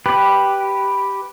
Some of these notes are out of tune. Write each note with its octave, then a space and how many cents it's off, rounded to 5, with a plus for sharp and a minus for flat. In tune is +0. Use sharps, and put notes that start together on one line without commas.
G4 +0 B4 +0